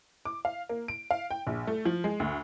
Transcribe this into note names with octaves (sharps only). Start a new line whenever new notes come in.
D6
F5
A#3
D7
F5
G5
A#1
A3
F3
G#3
D2